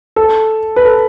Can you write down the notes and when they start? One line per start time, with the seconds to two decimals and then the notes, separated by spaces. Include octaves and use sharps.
0.16 A4
0.76 B4
0.85 A4